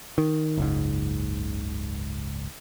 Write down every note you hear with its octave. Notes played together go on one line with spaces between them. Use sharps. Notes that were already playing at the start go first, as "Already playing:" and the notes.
D#3
F#1 C#2 G#2